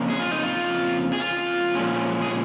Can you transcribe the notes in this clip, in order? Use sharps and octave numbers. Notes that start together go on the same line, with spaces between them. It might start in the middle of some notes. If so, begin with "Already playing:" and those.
Already playing: F2 C#3 A#3 C#4
G#4
F4
D#4
F4
G#4
F4
A#2 F3 G#3 C#4
G#4